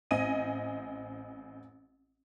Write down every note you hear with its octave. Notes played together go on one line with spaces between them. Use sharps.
A1 C4 D#5 G#5 D#7